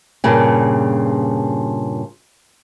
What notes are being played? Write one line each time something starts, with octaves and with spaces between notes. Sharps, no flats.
G2 A#2 C#3